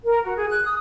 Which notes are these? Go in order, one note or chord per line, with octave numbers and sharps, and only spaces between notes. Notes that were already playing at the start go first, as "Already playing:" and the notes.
A#4
F#4
G#4
F#6
D#6